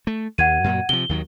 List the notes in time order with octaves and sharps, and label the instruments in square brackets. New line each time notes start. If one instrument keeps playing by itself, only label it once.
[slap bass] A3
[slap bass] D#2 [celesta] F#5 G#6 D#7
[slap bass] F#2 A#2 F#3
[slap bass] C3 F3 [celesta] G7
[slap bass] D#2 D#3 F#3